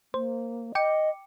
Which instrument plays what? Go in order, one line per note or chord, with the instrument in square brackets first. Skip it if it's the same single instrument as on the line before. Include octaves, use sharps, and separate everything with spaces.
[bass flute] A#3 [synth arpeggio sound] C5
[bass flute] D#5 [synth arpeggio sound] G5 D6 C#7